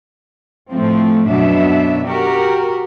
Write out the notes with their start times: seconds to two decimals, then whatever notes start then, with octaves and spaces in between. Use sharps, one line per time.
0.71 A2 F3 A3 C4
1.28 F#2 B2 F#3 D4 E5
2.06 F#4 G4 A#4